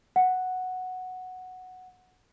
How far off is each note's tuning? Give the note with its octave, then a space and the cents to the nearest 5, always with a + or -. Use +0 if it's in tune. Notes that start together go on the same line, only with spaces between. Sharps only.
F#5 +0